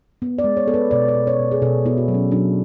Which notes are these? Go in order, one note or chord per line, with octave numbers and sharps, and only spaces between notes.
B3
D5
G#3
C#5
B3 A4
B4
B2 D5
D5
B2
C#5
B2
G#4
B2 A4
B3 E4
F#4
F#3
C#4
F#3 D4